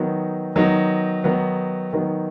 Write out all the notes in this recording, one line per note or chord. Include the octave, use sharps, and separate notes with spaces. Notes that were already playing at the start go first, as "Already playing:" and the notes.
Already playing: D#3 F#3 B3 D#4
D#3 F#3 B3 D#4
D#3 F#3 B3 D#4
D#3 F#3 B3 D#4